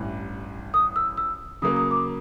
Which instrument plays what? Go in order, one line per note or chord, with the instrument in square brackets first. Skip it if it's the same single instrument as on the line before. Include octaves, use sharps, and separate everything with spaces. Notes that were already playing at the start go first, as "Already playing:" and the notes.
Already playing: [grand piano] A1 G2 E3
[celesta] D#6
E6
E6
[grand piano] C#3 F#3 A#3 [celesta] D#6
[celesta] D#6
D6